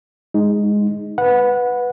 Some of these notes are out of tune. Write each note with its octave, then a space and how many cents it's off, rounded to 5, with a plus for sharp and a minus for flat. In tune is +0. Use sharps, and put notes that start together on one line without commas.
G#3 -5 D#4 +0
B4 +0 F#5 -20